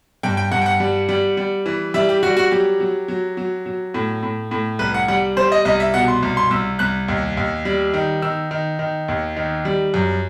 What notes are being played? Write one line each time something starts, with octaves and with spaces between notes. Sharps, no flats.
G2 G5
G5
G2 F#5
G5
F#5
G3
G3
G3
E3
G3 E5
G4
G3 F#4
F#4
F#3 G4
F#3
F#3
F#3
F#3
A2
A2
A2
C2 B4
F#5
G3 F#5
G3 C5
D#5
C2 D#5
E5
B2 F#5
C6
C2
C6
C2 E6
C2 F#6
D#2
D#2
G3
D#3
D#3 E6
D#3
D#3
D#2
D#3
G3
F#2